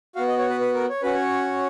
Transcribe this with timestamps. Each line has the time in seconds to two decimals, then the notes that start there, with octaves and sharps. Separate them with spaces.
0.16 B3 F#4 F5
0.28 D#5
0.39 C#5
0.50 B4
0.61 B4
0.74 A#4
0.89 C#5
1.02 C#4 F#4 B4
1.14 C#5